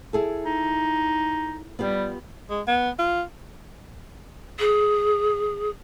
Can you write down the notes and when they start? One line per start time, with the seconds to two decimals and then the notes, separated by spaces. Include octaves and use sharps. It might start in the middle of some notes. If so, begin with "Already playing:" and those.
0.13 E4 G#4 A4
0.46 D#4
1.79 G3 B3 F4 G4
2.50 G#3
2.67 B3
2.99 F4
4.59 G#4